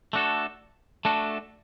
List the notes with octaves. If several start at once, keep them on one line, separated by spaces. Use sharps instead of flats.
A3 D4 F#4 A4
A3 D4 F#4 A4